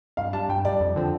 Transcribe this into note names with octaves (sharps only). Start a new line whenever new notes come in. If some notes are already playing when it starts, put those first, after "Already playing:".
G2 F5
G3 D4 A5
G2 G5
G3 D4 D5
F2
D3 F3 C4